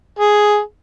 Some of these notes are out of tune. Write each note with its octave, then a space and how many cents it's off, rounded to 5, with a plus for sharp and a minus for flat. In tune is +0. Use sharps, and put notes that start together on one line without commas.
G#4 +5